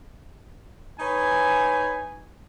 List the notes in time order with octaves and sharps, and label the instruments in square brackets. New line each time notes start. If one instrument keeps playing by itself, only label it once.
[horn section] D#4 B4 C#5 G#5